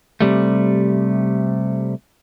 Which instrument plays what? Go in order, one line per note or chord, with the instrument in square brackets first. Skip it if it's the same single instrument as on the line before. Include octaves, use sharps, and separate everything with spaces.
[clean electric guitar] C3 G3 A3